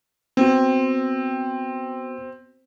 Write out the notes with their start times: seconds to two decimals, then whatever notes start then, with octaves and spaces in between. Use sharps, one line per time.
0.37 B3 C4 F#4